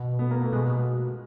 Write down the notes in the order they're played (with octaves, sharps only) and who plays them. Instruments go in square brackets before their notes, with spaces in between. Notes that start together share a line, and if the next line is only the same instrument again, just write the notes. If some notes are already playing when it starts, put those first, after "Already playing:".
Already playing: [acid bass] B2
[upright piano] B3
A#3
A3
[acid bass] B2 [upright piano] G#3